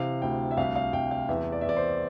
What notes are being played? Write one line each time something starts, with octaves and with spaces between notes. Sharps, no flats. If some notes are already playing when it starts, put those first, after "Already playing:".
Already playing: C3 E3 F5
D2 G5
E5
C2 F5
F5
C2 G5
F5
E2 E5
D5
E5
E2 D5
C5